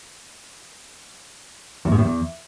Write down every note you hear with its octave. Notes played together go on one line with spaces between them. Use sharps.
E2
G#2
A2
E2